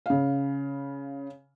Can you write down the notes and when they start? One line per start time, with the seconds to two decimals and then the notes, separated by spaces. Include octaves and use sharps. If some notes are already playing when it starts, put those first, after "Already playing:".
0.06 C#3 F5